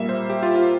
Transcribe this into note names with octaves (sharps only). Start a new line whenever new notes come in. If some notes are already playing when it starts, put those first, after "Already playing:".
Already playing: A#2 G3 A#3 E5
C5
G4
F4
F4